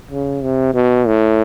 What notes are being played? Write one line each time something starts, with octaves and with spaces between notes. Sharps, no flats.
C#3
C3
B2
A2